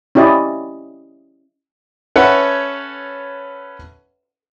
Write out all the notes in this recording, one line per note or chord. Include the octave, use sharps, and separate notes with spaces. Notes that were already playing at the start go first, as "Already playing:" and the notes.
C#4 E4 G4 D5 D#5
C#4 A4 B4 C#5 E5 F#5